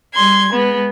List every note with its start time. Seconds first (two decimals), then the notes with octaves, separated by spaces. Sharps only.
0.13 G3 C6 G#6
0.52 G#3 B3